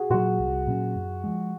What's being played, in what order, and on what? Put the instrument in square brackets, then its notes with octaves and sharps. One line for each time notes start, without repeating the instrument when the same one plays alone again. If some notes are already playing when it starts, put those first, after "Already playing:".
Already playing: [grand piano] F#4 G#4
[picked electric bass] A#2 F#3 [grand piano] F#4
[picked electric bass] C2
A#2 F#3 C#4
F#2
F3 G#3